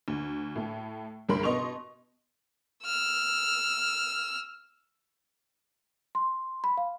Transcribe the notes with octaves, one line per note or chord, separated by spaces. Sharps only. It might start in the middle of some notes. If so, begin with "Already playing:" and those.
D2
A2 A3
G1 C2 C#3 A#4 B5 C6
B2 B3 D#5 C6 C#6 F7
E6 F6
C6
B5
F5